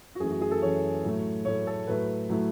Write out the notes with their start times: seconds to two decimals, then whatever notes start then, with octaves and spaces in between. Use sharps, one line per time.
0.15 F#4
0.20 F#2 E3 A3 G#4
0.31 F#4
0.41 G#4
0.51 A4
0.62 F#2 E3 A3 C#5
1.04 A2 F#3 A3
1.45 A2 F#3 A3 C#5
1.67 A4
1.87 A2 F#3 A3 B4
2.29 A2 F#3 A3